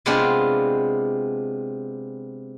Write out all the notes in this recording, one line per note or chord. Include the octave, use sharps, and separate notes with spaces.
C3 G#3 B3 C4 D4 F4